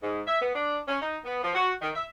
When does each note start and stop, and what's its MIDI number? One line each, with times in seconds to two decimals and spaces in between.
0.03 0.22 44
0.27 0.40 76
0.42 0.53 59
0.55 0.78 62
0.88 1.00 61
1.02 1.18 63
1.25 1.42 59
1.44 1.52 53
1.55 1.73 66
1.82 1.91 51
1.96 2.06 76